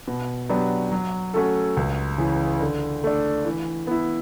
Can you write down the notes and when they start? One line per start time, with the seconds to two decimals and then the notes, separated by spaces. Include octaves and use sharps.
0.08 B2
0.49 F#3 B3 D4 G4
0.92 F#3
1.34 A3 C#4 F#4 A4
1.77 C#2
2.18 C#3 E3
2.61 D3
3.04 A3 D4
3.45 E3
3.87 B3 E4